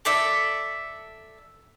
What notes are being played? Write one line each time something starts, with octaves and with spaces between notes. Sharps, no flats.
A4 D5 E5